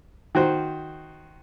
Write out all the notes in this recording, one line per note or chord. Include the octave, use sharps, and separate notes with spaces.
D#3 F#4 C5